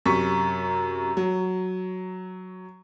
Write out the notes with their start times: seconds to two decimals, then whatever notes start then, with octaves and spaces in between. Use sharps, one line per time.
0.06 F#2 C3 C#6 B6
1.17 F#3